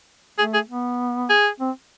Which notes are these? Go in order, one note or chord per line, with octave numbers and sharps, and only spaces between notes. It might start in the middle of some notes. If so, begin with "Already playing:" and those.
A3 G#4
G#4
B3
G#4
C4